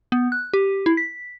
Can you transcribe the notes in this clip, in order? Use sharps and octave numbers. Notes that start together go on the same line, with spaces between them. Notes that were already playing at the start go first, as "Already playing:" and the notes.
B3
F#6
G4
E4
B6